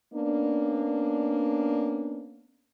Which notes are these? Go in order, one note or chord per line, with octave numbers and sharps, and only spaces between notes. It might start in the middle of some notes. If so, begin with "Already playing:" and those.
A#3 B3 C#4 D4